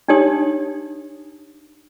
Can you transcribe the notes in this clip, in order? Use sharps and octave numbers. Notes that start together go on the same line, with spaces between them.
D4 D#4 G4 C#5 D#6